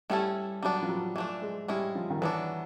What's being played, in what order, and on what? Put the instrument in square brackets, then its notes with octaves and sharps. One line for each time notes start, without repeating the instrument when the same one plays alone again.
[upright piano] G3 [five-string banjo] A3 C#4 E4 A4
[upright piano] F#3 [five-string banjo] G3 B3 D4
[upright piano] F3
F#3
[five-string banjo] E3 A3 D4 [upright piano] F3
[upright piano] G#3
[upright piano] G3 [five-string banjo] G#3 C#4 E4
[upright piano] F3
D#3
[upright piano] E3 [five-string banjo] F#3 B3 D4